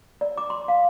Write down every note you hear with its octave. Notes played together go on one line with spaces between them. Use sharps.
D5
D6
C6
F5